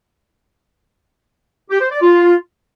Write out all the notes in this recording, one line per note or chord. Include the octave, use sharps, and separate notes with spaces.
G4
C5
D5
F4